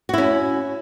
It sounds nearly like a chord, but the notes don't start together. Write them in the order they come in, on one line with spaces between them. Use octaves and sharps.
F#4 E4 C#4